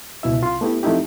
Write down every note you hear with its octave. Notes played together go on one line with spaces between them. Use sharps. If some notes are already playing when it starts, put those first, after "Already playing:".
C#2 B2 E4 E5
C2 F4 C6
A3 B3 E4 G4
F3 A3 C4 D#4 E4 G4